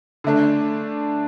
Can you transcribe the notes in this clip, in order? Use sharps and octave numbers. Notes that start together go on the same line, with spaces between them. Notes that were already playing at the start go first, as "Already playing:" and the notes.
D3 A3 D4